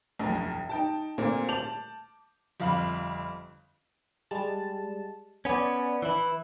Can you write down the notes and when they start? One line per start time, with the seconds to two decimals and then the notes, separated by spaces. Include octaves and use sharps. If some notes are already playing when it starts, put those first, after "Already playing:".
0.19 E1 A#1 F#2
0.69 D#4 G5 A5
1.18 A#2 D3 A#3 C4
1.49 A5 D6 G6 F7 F#7
2.60 G1 F2 F5 B5 F#7
4.31 G3 G#3 A5
5.45 B3 C#4 D5 G#5
6.02 E3 E4